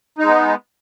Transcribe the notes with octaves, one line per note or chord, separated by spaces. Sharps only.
G#3 B3 D#4